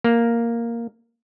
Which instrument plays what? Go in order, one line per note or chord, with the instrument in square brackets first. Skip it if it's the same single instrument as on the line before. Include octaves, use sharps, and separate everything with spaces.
[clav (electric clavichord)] A#3